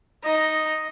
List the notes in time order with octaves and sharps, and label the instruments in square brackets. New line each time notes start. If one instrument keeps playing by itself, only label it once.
[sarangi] D#4 [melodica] D#5